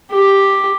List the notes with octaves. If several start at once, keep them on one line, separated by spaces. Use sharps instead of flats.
G4